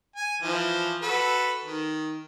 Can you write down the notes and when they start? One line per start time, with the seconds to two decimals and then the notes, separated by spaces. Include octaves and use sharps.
0.16 G#5
0.42 E3 F3
1.02 F#4 A4 B4
1.64 D#3